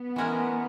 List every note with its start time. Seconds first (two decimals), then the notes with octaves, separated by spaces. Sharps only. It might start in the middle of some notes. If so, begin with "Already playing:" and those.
Already playing: B3
0.16 E3 G#3 C#4 F#4 A#4